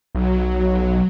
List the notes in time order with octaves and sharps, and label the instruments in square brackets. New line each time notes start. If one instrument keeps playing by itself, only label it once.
[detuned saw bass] B1 [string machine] F#3